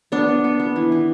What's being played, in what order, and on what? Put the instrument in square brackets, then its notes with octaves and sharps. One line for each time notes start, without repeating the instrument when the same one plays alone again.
[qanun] B3 D4
B3
B3
B3
E3
E3